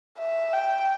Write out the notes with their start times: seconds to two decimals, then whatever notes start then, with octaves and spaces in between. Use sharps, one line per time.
0.19 E5
0.53 G5